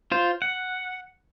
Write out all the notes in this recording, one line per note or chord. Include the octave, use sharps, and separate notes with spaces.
F4 C5
F#5